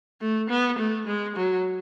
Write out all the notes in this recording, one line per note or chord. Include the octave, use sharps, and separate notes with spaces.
A3
B3
A3
G#3
F#3